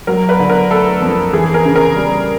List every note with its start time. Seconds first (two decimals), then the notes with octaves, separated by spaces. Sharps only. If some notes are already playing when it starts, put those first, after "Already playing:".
0.07 F#3 A#4
0.29 B4
0.39 D3
0.49 A#4
0.70 A3 A4
1.02 F2
1.33 E3 G#4
1.54 A#4
1.65 C#3
1.75 A#4
1.96 G3